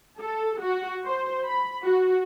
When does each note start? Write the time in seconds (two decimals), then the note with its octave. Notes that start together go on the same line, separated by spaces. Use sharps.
0.21 A4
0.62 F#4
1.05 C5
1.46 B5
1.84 F#4